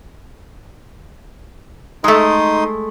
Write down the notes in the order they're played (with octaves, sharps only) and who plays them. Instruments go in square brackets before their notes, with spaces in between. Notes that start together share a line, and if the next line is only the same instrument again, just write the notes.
[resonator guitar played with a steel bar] G#3 A3 [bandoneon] D#4 C6 D#6